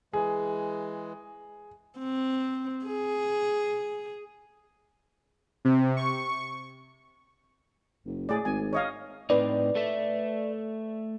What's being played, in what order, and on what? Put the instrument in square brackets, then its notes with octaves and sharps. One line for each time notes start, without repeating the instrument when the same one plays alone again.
[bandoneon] E3 G#3 [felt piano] G#4
[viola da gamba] C4
G#4
[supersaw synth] C3
C#6
[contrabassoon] F#1
[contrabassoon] A2 [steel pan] G#4 D5
[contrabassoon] G#1 [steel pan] G#5
[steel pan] C#5 D#5 F5
[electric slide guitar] A2 C4 D#4 [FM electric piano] B4 D5
[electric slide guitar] A3 A4 E5